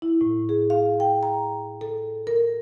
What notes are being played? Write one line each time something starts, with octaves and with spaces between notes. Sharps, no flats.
E4
A2
G#4
F5
G5
A#5
A4
A#4